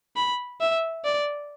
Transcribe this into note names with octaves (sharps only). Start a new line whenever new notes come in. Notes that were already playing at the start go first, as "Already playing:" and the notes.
B5
E5
D5